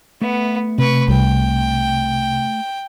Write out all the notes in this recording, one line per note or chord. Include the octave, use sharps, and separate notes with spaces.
A3 B3 E5 F#5
C3 B4 C#6
C2 G5